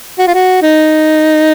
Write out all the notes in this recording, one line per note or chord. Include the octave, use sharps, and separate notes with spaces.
F#4
F4
F#4
D#4